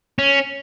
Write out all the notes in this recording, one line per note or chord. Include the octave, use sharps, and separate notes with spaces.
C#4